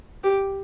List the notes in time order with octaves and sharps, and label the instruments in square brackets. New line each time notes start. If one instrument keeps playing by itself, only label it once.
[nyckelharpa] G4